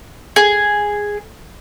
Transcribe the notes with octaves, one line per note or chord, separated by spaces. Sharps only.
G#4